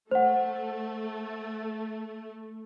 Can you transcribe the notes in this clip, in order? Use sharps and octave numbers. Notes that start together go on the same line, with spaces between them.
A3 C5 F#5